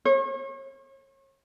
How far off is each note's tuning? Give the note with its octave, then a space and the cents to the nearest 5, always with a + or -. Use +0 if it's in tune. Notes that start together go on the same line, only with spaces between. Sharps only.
C#5 -40